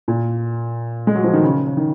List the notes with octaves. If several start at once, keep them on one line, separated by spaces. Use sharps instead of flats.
A#2
G#3
F#3
F3
D#3
C#3
C#3
D#3